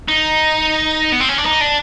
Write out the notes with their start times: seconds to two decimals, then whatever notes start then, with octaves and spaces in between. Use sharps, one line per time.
0.08 D#4
1.12 B3
1.20 C4
1.29 C#4
1.38 D4
1.46 D#4
1.61 D4